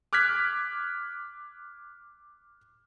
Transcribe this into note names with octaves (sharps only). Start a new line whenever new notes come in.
D6 F6 F#6 G#6 B6